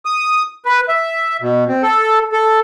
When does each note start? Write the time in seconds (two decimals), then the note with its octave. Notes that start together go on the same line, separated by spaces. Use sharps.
0.05 D#6
0.66 B4
0.88 E5
1.42 B2
1.68 C4
1.83 A4
2.32 A4